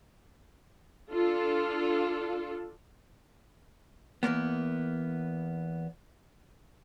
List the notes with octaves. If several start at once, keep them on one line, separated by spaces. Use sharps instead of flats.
D4 F4 A4
E2 G2 A#3 B3